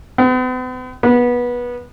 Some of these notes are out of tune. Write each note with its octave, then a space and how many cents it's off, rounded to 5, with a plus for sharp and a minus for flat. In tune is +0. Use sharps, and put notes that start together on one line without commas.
B3 +45
B3 -20